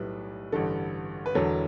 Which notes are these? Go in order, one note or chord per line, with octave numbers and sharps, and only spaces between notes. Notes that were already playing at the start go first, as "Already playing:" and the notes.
Already playing: B1 A2 G3 B4
A1 G2 D3 A4
B4
E1 E2 D3 F#3 A4